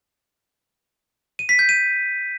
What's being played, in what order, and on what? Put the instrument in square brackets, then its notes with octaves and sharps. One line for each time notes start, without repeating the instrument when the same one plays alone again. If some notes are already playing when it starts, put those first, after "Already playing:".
[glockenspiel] D#7
B6
G6
D#7